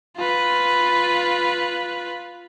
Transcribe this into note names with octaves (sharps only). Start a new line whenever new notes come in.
F4 B4